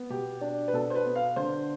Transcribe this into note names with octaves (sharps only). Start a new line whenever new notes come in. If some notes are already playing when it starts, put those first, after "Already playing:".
Already playing: B3
B2 G4
D4
B4
B2 A4
C5
B4
B3
F5
D3 C5